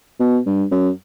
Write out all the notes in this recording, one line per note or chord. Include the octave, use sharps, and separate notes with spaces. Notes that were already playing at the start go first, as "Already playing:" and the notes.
B2
G2
F#2